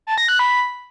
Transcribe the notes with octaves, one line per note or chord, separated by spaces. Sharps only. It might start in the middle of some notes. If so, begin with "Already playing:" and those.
A5
A#6
F#6
B5